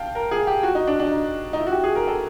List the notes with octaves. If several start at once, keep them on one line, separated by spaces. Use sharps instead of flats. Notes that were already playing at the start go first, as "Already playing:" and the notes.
Already playing: F5 G5 A5
A#4
G#4
G4
F#4
D#4
D4
D4
D#4
D#4
E4
F#4
G4
G#4
A#4
A4